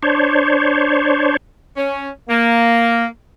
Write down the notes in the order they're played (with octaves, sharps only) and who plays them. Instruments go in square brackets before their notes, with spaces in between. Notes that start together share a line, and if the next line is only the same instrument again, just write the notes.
[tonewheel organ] D4 C5 C#5
[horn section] C#4
A#3